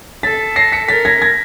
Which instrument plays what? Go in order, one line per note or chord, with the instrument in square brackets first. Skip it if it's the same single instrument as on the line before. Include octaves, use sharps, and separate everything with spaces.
[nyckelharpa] A4 [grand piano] A6 B6
[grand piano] A#6 C7
B6 C#7
[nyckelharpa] A#4 [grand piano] A6 B6
[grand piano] G#6 A#6
G#6 A#6